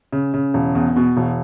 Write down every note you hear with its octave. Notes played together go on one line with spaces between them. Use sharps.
C#3
C#3
E1
E2
B2
E1